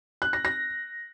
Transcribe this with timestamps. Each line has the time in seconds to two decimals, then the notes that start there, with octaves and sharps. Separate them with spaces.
0.22 F#6
0.33 A#6
0.45 A#6